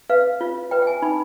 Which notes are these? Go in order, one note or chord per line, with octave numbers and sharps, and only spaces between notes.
B4 F5
F4
B4 G5
G5
G#5
D#4 B5